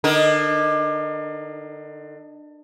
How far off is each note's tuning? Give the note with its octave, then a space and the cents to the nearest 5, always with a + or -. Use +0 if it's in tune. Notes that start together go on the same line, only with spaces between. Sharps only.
D3 +25 D#4 +0 A#4 +20